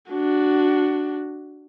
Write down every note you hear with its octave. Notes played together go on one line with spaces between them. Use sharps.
D4 F#4